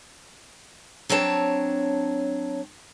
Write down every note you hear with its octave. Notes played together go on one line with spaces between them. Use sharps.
F#3 C4 D4 C#5 A5